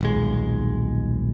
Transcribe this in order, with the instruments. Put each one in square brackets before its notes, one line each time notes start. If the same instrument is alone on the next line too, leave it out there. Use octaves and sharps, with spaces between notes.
[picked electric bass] D#1 B1 G#3